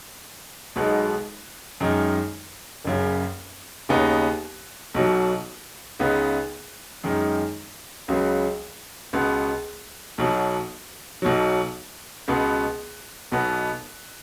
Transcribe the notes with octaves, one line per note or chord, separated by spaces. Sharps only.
B1 B2 G#3 B3 D#4
F#2 D#3 G#3 D#4
F#1 F#2 C#3
D#2 C#3 B3 D#4
B1 B2 F#3
C#2 C#3 B3 D#4
F#2 D#3 G#3 D#4
C#2 C#3 F#3 B3
C#2 B2 B3
B1 B2 F#3
B1 B2 F#3
C#2 B2 B3
B1 B2 B3